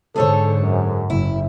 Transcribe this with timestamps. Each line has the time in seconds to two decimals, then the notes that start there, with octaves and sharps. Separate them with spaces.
0.16 G#2 D3 G#4 A4 C5 C#5
0.61 F#2
1.10 F#1 E4